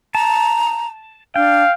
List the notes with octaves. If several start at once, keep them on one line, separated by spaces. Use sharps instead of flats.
A5 A#5
D4 F5 G5